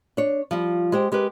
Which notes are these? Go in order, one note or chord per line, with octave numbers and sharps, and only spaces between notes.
D4 C#5
F3 G3 F4
G#3 G4 C5 G5
G#3 G4 A#4 B4